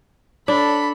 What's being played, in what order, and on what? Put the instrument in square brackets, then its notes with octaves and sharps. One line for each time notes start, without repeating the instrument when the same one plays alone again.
[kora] D4 [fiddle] A4 B5